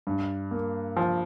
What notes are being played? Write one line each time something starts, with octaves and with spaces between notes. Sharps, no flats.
G2
A#3
F3